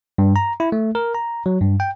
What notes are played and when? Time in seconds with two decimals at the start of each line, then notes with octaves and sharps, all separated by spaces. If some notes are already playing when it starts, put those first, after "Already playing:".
0.18 G2
0.36 A#5
0.60 E4
0.72 A3
0.95 A#4
1.15 A#5
1.46 F#3
1.61 G2
1.80 G5